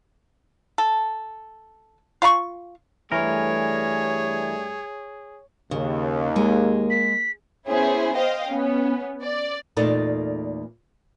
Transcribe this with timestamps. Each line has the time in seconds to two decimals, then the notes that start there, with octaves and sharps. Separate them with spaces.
0.78 A4
2.22 F4 F5 B5 C#6
3.12 G2 E3 G3 A3 G#4 A#4 C#5
5.71 D#2 C#3
6.36 G#3 A#3
6.90 B6
7.68 B3 C#4 E4 G#4 C5
8.16 C5 D#5 F5 G5
8.48 B3 C#4
9.23 D5
9.77 E2 A#2 A3 D#4 A4 D5